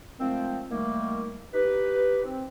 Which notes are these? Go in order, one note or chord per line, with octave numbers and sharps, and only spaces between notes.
D#3 F3 G#3 A3 C4
D#3 G3 A3 A#3
D#4 G4 B4
C4